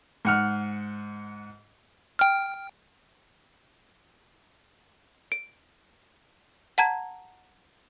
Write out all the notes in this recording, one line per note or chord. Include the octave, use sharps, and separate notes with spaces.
G#2 F#5 F6
G5 F6
D7
F#5 A5 A#5 G#6